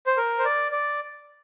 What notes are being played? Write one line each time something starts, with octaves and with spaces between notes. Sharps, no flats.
C5
A#4
C5
D5
D5